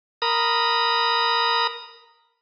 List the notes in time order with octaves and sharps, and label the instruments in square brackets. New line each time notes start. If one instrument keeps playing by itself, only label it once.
[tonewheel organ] A#4 A#5 B5 D#6